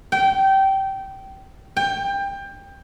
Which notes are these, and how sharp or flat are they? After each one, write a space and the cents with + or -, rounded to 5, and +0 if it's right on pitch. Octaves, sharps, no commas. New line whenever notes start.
G5 -20
G5 +20